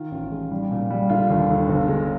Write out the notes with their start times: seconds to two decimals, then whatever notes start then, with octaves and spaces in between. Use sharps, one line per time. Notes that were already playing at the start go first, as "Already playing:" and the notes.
Already playing: D#3 F4
0.12 A1
0.32 G#3
0.51 G3
0.71 A#2
0.90 G3
1.10 D3 F4
1.30 D#2
1.49 D3
1.68 G1
1.88 G#3